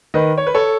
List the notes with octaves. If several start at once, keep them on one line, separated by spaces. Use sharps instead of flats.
D#3 B4 D#5
C#5
B4
A4 C#5